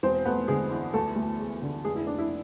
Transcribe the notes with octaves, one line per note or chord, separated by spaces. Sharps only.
E1 C4 C5
A3 B3 B4
D3 G#3 G#4
E2
D2 A3 A4
D2
G#3
D3
F1 G#3 G#4
E4
F1 D4
E4